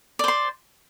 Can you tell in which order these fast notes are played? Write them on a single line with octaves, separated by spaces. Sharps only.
D5 C5 C6